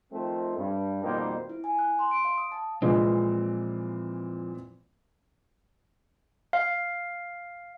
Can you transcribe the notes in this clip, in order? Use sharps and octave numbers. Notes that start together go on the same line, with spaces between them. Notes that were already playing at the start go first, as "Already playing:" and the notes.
D#3 F3 A3 C4
G2
F2 B2 D#3 G3 A#3 C5
E4
G#5
F#6
C6
D7
F5
D#6
A5
A#2 E3 F3 G#3 C4
F5